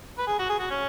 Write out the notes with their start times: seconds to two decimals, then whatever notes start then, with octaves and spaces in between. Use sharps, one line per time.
0.19 B4
0.27 G#4
0.39 F#4
0.50 G#4
0.59 F#4
0.71 C#4